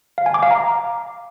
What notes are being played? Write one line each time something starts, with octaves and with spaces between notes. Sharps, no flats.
F5
G#5
D6
F5
A#5